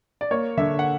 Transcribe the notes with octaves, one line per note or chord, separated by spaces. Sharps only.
D5
A#3 C#5
D3 E5
F#5